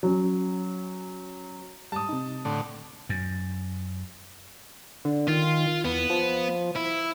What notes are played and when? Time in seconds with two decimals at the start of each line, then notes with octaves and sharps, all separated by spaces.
0.03 F#3 C#4
1.92 G#2 G3 A5 D#6
2.09 C3 D#4
2.45 A2 D3
3.09 F#2
5.05 D3
5.28 D#3 F4
5.85 E2 B3
6.10 F3
6.76 E4